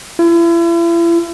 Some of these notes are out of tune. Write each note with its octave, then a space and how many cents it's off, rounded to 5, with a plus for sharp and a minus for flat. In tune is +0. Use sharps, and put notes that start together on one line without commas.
E4 +40